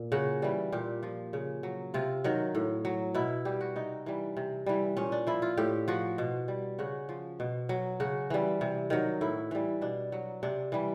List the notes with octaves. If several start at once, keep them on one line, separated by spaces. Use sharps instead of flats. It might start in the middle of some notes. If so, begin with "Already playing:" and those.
Already playing: A#2
C#3 F#4
E3 G3
A#2 G4
F3
C#3
F#3
C3 F4
D#3 F#3
A2
F#3
B2 E4
G3 G4
F#4
C3 D#4
E3 G3
C3
E3 G3
A#2 C#4
D4
F3 E4
F4
A2 G4
F3 F#4
B2
G3
C#3 F#4
F3
B2
F#3
C#3 F#4
E3 G3
C3
D#3 F#3
A2 E4
E3 G3
B2 D4
F#3
C3 D4
E3 G3